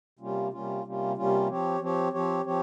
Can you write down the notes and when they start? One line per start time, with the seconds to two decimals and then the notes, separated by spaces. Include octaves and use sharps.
0.19 C3 G3 A#3 C#4 F4
0.51 C3 G3 A#3 C#4 F4
0.83 C3 G3 A#3 C#4 F4
1.16 C3 G3 A#3 C#4 F4
1.47 F3 C4 G4 C#5
1.80 F3 C4 G4 C#5
2.12 F3 C4 G4 C#5
2.44 F3 C4 G4 C#5